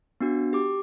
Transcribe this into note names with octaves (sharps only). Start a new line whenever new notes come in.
B3 D4 F#4
G4 D6